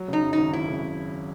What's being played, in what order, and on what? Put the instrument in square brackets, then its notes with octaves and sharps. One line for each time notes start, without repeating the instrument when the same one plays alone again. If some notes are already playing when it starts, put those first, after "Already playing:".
Already playing: [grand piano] F#3
[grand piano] C#3 [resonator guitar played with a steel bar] D#4
[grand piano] F#2
[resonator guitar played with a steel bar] D#4
[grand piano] G#1
[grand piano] G#1 [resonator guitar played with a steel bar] E4
[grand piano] C#3
C#3